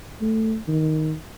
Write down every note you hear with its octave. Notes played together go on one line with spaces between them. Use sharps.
A3
D#3